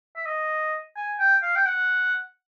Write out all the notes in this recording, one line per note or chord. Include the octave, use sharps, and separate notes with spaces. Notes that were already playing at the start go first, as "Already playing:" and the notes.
E5
D#5
G#5
G5
F5
G5
F#5